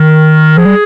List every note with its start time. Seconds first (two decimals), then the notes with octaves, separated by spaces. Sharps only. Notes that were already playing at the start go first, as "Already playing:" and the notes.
Already playing: D#3 A#4
0.57 F3 G#4
0.65 G3